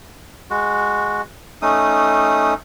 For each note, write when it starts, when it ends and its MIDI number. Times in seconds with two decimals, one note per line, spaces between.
0.50 1.22 56
0.50 1.22 66
1.62 2.54 57
1.62 2.54 61
1.62 2.54 63
1.62 2.54 87